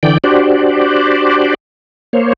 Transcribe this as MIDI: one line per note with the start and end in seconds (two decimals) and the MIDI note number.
0.03 0.18 50
0.03 0.18 52
0.03 0.18 74
0.03 0.18 79
0.24 1.54 62
0.24 1.54 66
0.24 1.54 67
0.24 1.54 72
0.24 1.54 74
2.13 2.33 58
2.13 2.33 72
2.13 2.33 73